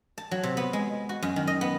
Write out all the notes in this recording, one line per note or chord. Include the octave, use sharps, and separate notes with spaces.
A5
F#3
C3
B3
G#3
F#4
F#2
D#3
D#5
B3